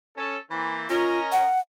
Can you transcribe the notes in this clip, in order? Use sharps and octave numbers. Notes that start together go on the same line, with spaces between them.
C#4 A4
E3 A#3 C4
C#4 F4 A#4 D#5
F#5